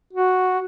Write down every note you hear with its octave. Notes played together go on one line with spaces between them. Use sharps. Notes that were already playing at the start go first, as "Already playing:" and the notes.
F#4